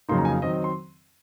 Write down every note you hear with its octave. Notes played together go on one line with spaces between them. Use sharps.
F2 C#3 F#3 A#3 D#4 C6
A#5
G#5
F5
D#3 F#3 C4 D#5
D#5
C6